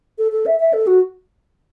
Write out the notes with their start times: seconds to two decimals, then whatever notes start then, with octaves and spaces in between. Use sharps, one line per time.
0.18 A4
0.32 A4
0.46 E5
0.60 E5
0.73 A4
0.87 F#4